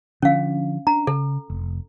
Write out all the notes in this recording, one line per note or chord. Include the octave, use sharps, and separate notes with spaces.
D3 F3 C#4 F5
D4 A#5
C#3 A4
F1